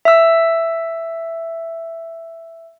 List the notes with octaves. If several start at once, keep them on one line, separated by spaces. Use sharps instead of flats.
E5 E6